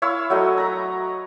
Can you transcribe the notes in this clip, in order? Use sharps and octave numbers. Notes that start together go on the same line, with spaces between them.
E4 C#5 F5 E6
F#3 A3 D#5
A#5 B5